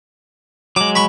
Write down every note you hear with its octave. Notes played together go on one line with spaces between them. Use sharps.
F#3 G#3 D6
B5 C#6